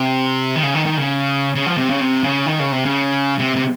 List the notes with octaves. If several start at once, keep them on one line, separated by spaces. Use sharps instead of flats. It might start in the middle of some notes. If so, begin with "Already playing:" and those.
Already playing: C3
D#3
C#3
D#3
D#3
C#3
C#3
F3
C3
C#3
C3
C#3
D#3
C#3
C3
C#3
C3
C3